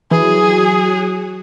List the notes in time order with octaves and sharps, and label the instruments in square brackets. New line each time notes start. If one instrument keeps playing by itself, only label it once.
[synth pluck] E3 [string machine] F#3 F#4 D#6 [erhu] G#4